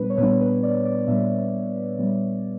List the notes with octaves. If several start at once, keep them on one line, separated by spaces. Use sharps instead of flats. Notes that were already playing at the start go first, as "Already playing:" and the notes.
Already playing: A#2 G3 B3 D4 B4
C#5
A#2 G3 B3 D4 B4
B4
D5
D5
A#2 G3 B3 D4 E5
A#2 G3 B3 D4